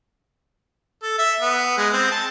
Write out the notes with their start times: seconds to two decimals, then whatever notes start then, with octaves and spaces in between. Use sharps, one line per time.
1.03 A4
1.19 E5
1.40 B3
1.78 G#3
1.94 C4
2.12 A5